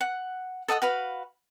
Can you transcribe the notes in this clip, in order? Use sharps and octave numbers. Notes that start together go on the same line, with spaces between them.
F#5
A4 D#5 F#5 D#6
F#4 B4 F5